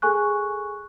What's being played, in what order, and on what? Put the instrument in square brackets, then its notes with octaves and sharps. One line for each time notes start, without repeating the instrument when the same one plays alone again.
[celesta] G#4 A4 G#5 C#6 F#6